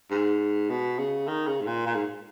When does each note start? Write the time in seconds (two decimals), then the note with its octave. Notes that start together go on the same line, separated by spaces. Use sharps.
0.11 G#2
0.70 B2
0.99 C#3
1.28 D#3
1.47 C#3
1.61 G#2
1.67 A#2
1.87 A#2
1.95 G#2